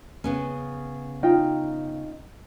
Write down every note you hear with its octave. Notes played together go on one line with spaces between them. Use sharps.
C#3 B3 C#4
D#4 F4 G5